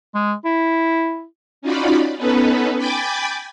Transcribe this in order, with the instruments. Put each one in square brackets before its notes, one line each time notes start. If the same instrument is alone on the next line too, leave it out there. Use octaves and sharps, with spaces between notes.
[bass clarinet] G#3
E4
[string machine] C#4 D#4 F4 F#4 D5 B5
B3 C#4 D#4 A4 B4
G5 G#5 B5 D6 G6 A6